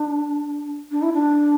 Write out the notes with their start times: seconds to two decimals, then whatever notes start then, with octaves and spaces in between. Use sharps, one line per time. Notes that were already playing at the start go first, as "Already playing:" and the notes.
Already playing: D4
0.91 D4
1.02 E4
1.13 D4